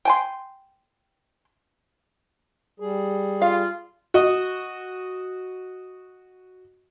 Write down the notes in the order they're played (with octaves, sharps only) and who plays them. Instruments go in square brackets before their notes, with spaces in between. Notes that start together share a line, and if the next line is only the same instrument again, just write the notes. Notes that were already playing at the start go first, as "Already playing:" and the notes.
[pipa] G5 G#5 C6
[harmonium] G3 G#4
[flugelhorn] F4 [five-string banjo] F5
[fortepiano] F#4 D#5